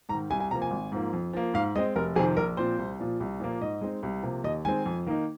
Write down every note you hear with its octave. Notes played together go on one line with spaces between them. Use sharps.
G#2 A#5
D#3
C2 G#5
G#5
C3 F3 A#3 A#5
G#5
G#1
G#2 F3 A#3
F2
F3 A#3
G#2 F5
G#3 C4 D#5
F1 A#4
F2 C3 D#3 C4 G#4
A#1 A#4
A#2 F3 C4 C5
C2
A#2 F3
C2
A#2 F3 A#3
G#2 D#5
G#3 C4 D#4
C2
C3 F3 A#3
D#2 D#5
D#3 G#3 C4 G#5
F2
D#3 A#3 D#4